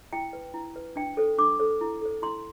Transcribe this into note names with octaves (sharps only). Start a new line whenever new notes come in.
E4 G5
B4
E4
B4
D4 G5
A4 C5
D4 D6
A4 C5
E4
A4 C5
E4 C6